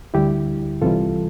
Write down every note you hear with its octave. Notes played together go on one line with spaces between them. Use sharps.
D2 D3 G3 E4 G4
C2 C3 E3 G3 F4 A4